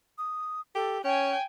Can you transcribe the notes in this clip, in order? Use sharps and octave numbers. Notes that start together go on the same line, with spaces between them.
D#6
G4 A4
C#4 C#5 G5 G#5